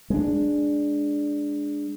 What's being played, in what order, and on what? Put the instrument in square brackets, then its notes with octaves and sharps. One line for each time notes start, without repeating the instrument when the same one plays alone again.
[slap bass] G#3 D4